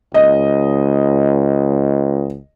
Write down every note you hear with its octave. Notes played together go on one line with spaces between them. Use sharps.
C#2 D#5